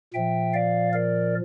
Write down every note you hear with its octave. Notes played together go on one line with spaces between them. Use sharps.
A#2 F3 E5 G5
D5 F5
A#4 D5